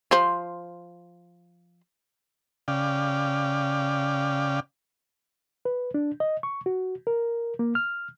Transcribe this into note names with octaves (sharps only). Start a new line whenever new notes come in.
F3 C5
C#3 D5 F5 G5
B4
D4
D#5
C#6
F#4
A#4
A#3
F6